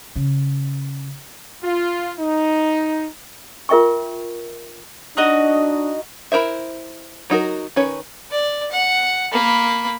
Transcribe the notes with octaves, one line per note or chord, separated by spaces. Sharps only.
C#3
F4
D#4
F4 A#4 E5 G5 C#6
D4 D#4 F#4 D#5
E4 A#4 C5 E5
F#3 D#4 F#4 A#4
D#3 C#4 B4 C#5
D5
F#5
A#3 B5